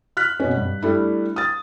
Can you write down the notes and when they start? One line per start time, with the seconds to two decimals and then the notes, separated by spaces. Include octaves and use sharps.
0.17 F6 F#6 B6
0.40 B2 C#4
0.57 G2
0.82 G3 A3 D4 E4
1.36 D#6 A6